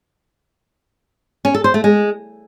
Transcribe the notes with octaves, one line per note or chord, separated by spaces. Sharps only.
C#4
A4
C5
A3
G#3